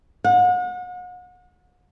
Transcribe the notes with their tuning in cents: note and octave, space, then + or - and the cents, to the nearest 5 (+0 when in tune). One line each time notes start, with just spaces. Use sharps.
F#5 -40